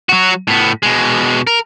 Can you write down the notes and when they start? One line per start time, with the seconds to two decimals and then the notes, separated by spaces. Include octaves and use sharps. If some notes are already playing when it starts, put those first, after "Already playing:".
0.09 F#3 F#4
0.48 A2 B3
0.83 B2 G#3
1.47 A#4